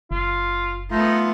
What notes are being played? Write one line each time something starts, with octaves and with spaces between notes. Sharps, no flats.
F#1 F4
A3 B3 D#4 F4